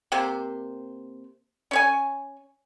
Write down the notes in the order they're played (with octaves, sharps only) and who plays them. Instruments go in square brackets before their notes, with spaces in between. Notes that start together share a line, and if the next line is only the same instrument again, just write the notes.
[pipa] C3 A#3 G4 C5
C#4 C#5 G#5